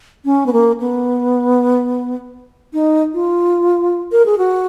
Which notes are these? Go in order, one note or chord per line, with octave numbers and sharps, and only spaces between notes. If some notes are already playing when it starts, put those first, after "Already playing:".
C#4
B3
A#3
B3
D#4
F4
A#4
G#4
F#4